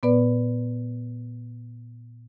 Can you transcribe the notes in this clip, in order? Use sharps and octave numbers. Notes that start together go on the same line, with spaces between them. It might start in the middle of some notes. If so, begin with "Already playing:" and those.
A#2 B3 B4 D5